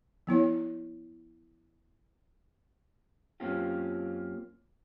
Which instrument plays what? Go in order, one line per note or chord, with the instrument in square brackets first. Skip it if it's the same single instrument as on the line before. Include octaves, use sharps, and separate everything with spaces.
[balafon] F3 B3 E4 C#5
[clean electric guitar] F#2 A#3 C4 C#4 F4 G4